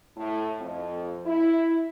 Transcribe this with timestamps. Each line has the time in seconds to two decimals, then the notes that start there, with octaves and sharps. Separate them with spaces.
0.17 A2
0.60 F2
1.26 E4